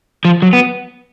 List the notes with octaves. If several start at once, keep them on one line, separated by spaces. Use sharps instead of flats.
F3
F#3
B3